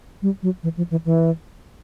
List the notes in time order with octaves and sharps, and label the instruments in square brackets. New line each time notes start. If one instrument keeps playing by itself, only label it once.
[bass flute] G3
F#3
E3
F3
E3
E3